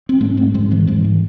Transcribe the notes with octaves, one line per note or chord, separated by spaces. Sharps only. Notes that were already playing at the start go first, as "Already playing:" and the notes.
C4
G#2 A3 C#4
G#3 C4
G#2 G#3 C4
E3 G#3
G#2 E3 G#3
E3